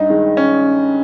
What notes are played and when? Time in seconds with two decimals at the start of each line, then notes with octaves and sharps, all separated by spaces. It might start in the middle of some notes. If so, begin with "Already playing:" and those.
Already playing: G2 D#4
0.10 D#3 G#3
0.37 C#4